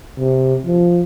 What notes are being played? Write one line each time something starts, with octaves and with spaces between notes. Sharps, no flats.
C3
F3